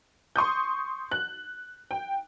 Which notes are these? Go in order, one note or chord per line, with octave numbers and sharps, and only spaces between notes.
C6 C#6 D#6 G6
F#6
G5